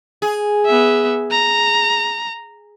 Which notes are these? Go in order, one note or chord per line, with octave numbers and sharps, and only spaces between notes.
G#4
B3 E5
A#5